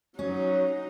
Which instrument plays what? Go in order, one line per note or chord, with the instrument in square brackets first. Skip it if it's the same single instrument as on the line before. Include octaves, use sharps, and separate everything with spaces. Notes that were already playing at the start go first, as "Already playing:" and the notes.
[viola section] F#3 [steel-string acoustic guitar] C#4 [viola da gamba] D#4